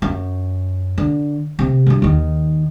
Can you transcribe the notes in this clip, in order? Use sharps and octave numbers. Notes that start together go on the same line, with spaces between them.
F#2
D3
C3
G2 F#3
D#2 D#3